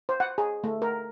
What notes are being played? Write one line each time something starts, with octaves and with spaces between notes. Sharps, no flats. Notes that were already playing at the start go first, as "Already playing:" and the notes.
C5
F#5
G#4
A3
A#4